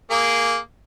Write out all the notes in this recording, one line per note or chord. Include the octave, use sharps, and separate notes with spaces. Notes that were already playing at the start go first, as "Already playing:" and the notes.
A#3 G#4